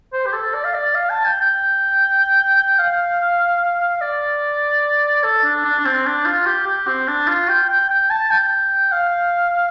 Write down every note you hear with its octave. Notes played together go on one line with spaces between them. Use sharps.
C5
G4
A4
D5
F5
D5
F5
A5
G5
G5
F5
D5
A4
D4
D4
D4
C4
D4
F4
G4
G4
C4
D4
F4
G5
G5
G5
A5
G5
F5